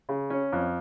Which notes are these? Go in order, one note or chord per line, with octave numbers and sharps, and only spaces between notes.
C#3
C#4
F2